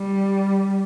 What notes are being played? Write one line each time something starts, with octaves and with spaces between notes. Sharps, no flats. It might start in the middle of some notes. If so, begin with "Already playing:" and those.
Already playing: G3